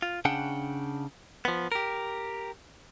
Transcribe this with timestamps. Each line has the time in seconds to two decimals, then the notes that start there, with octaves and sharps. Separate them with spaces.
0.02 F4
0.25 C#3 D4 F#5 G5
1.45 F3 B3
1.72 G4 A#4